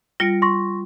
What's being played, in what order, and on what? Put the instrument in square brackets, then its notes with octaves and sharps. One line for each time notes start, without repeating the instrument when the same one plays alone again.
[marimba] G3 F4 [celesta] A#6 C#7 D7
[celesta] C6 C#6 A#6